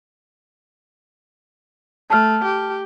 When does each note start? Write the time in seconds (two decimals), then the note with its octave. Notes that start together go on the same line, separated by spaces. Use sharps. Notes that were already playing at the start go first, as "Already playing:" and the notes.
2.10 A3 A5 F6
2.44 G4